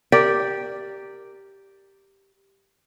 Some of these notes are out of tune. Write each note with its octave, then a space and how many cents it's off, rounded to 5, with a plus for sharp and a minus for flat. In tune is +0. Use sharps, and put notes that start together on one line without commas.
G4 +0 A#4 -10 D5 +0